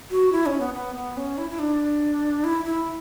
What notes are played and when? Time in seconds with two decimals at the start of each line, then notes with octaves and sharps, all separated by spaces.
0.11 F#4
0.32 E4
0.46 C#4
0.60 B3
0.74 B3
0.96 B3
1.17 C#4
1.38 E4
1.50 E4
1.59 D4
2.44 E4
2.65 E4